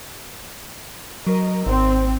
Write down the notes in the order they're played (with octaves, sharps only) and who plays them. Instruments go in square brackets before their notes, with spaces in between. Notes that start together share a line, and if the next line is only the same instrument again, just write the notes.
[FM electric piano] F#3 [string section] A#4 D#5
[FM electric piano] G#1 [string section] C4